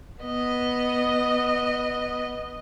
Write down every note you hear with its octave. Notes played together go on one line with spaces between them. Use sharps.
B3 D#5